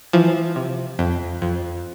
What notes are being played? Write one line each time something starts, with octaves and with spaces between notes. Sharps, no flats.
E3 F3
C3
F2
F2